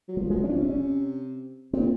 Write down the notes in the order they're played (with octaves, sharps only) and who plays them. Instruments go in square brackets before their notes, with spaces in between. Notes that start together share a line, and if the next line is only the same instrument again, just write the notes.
[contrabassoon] F#3
[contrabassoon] F3 [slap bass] G3
[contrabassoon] F#3 [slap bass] G#3
[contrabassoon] F3 [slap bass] C#4
[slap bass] D4
[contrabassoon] C3 [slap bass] C#4
[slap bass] C#4
[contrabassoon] A#2 [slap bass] C4